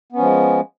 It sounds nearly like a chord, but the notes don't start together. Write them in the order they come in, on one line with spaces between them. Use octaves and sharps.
B3 C#4 F3 G#3